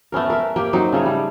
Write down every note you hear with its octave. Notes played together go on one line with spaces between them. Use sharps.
A3 B3 C#4 A#4
A#4 E5
A#3 G4 G5
F#3 C4 D#4
C#3 A3 G#4 C#5
G3